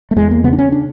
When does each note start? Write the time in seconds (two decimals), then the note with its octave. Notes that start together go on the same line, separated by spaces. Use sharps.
0.11 A3
0.16 E2 G#3
0.31 A#3
0.44 C#3 B3
0.53 D4
0.59 C#4
0.72 D4